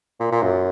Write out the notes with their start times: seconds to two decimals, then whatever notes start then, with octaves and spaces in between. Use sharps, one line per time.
0.20 A#2
0.32 A#2
0.43 F#2